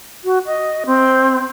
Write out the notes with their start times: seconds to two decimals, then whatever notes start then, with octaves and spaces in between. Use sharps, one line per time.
0.24 F#4
0.46 D#5
0.86 C4